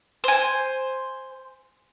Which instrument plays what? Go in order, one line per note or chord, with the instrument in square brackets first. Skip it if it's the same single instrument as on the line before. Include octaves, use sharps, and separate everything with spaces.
[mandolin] C5 G#5